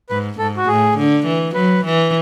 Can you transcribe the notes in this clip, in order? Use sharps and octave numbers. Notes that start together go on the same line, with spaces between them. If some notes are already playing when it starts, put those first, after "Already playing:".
G#2 B4
G#2 A4
F#4
A2 G#4
D3
E3
F#3 B4
E3